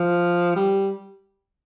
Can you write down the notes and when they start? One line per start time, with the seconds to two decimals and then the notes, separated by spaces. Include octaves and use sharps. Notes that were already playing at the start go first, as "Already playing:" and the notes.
Already playing: F3
0.56 G3